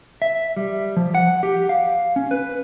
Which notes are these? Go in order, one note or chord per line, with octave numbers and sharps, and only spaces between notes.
E5
G3
F3
F#5
G4
F5
C#4
B4